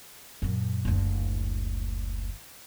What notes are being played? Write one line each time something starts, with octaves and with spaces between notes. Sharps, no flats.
F#2 A#2
F#1 D2